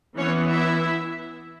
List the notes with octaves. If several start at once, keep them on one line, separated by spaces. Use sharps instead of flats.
E3 B3 C#4 C#5
E4 E5